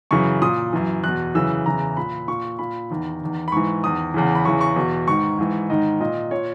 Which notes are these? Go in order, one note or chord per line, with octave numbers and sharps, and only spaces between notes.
F#2 C#3 E3 C#6
A#2 D#6
F#2 E3
E2 B2 F#6
F#2 C#3 E3 E6
E2 C#3 E3 A#5
A#2 B5
A#2 C#6
A#2 B5
E2 D#3
E2 D#3
B5
G#2 E3 C#6
E2 D#3 D#6
E2 C#3 E3
B5
E2 C#3 E3 C#6
C#6
E2 B2
G#2 D#3 C#6
G#2 E3
G#2 D#3 D#5
A#2 D#5
A#2 C#5